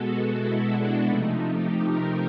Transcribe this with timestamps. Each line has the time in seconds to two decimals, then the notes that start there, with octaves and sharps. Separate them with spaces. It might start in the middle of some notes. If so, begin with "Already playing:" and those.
Already playing: B2 G#3 B3 F#4 A4
0.31 E4
0.69 D4
1.07 C3 F3 A3 D#4
1.46 G4
1.84 A#4